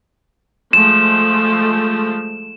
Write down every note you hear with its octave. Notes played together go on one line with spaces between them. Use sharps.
F3 G#3 A3 E7